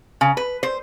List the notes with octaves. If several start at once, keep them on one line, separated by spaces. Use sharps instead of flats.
C#3
B4
C5